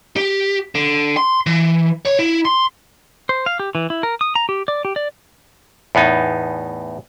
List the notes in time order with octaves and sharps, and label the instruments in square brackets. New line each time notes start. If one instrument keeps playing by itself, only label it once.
[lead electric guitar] G4
D3
C6
E3
C#5
E4
C6
[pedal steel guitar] C5
F5
G4
E3
E4
A#4
D#6
A#5
G4
D5
G4
D5
[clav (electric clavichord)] E2 A2 B3 D#4